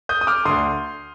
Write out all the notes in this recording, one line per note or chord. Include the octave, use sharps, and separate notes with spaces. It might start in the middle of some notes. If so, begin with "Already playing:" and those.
D#6 G6
D#6
D6 F6
D2 D3 C6 D#6